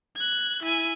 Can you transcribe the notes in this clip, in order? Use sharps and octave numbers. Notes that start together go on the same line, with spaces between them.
F#6 G#6
E4 G#5